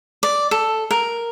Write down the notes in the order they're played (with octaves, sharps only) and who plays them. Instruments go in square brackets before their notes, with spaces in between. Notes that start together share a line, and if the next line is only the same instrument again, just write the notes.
[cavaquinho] D5
A4
A#4